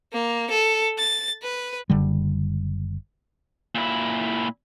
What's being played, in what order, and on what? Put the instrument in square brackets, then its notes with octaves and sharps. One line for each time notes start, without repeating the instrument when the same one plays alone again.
[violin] A#3
A4
A6
B4
[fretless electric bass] F#1 D3 G3
[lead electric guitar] A#2 E4